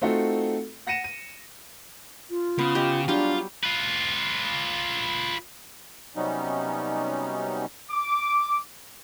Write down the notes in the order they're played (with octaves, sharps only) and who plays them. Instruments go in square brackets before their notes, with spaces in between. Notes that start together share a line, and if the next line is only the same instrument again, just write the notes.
[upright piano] A3 C4 D#4 F4 F#4 A4
F#5 A#6 C#7 D#7 E7
D#7
[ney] F4
[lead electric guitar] C#3 [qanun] B3
[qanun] G4 D#5
[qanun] F#3 G3 G4 [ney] D4 [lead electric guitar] F4
[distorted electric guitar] F4 B4
[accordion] C3 F#3 G3 B3 C#4 D#4
[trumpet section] D6